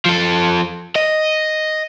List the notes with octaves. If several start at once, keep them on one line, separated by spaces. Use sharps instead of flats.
F3 A4
D#5